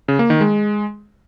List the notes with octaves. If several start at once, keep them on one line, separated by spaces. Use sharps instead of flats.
C#3
A#3
D#3
G#3